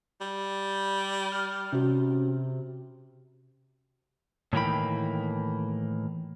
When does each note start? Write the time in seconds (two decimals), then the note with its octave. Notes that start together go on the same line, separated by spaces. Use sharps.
0.21 G3
1.32 F6
1.72 C3 C#4 F#4
4.53 A2 D#3 E3 A#3 G5 B5